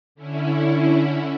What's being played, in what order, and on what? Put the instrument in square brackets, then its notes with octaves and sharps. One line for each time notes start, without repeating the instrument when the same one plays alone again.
[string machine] D3 C#4 E4